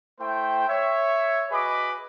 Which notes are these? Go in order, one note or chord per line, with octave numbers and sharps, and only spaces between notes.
A3 E4 C5 E5 G5
C#5 E5
F#4 G#4 B4 D#5 B5 D6